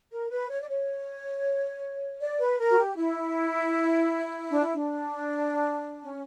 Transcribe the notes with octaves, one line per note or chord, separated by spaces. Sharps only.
A#4
B4
C#5
D5
C#5
D5
B4
A#4
F#4
G4
E4
D4
E4
D4
C#4